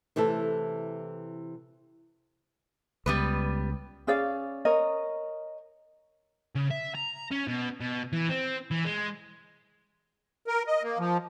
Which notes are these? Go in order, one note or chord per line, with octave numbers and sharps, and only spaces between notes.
C3 E3 A3 E4 A4
C#2 G3 B3 B4
C#4 G#4 D5 F5
A#4 C#5 D#5
C#3
E5
A#5
C#4
B2
B2
E3
C4
E3
G#3
A#4
D#5
A#3
F3